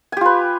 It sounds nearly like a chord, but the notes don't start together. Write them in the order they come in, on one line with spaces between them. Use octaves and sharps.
G#5 G4 F4 B4